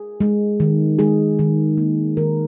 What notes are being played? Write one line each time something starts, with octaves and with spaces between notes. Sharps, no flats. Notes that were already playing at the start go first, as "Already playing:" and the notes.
Already playing: G#4
G#3
D#3
G#3 G#4
D#3
A#3
D#3 A#4